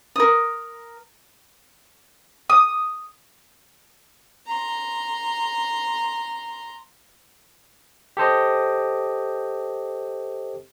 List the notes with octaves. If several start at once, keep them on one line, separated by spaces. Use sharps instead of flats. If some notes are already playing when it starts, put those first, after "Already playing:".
A#4 D#6
D#6
A#5 C6
G4 A4 C5 D#5